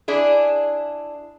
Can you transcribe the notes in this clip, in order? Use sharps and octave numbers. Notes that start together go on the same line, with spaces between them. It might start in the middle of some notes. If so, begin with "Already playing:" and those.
D4 E4 G#4